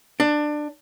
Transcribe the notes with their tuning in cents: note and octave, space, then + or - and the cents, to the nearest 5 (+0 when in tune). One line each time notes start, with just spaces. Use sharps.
D4 +20